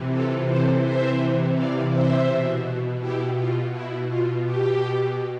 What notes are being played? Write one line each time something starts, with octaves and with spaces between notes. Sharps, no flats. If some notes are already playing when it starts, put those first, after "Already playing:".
Already playing: C3 E3
F4 A4
A4 C5
C5 E5
D5 F5
C5 E5
B2
E4 G4
F4
E4
F4
G4